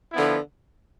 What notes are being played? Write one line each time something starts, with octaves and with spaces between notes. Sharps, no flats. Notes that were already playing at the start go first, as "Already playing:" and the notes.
D3 F3 B3 E4